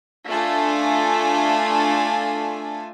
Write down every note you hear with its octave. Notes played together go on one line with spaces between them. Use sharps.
A3 D4 F4 A4 G#5